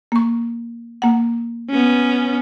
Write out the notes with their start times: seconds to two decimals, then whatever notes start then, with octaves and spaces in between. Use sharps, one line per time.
0.12 A#3 C#6
1.02 A#3 F#5
1.70 B3 C#4